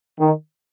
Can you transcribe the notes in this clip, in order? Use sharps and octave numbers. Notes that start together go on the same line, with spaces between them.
D#3